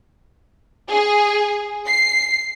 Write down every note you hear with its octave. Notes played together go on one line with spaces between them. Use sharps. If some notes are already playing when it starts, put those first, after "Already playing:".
G#4
C7